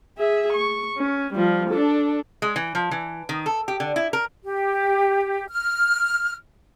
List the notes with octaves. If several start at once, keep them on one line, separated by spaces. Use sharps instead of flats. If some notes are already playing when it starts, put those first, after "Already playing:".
G#4 E5
C#6
C#4
F3 G3
D4 A4
G#3
E3
F3
E3
D#3
A4
G4
D3
E4
A#4
G4
F6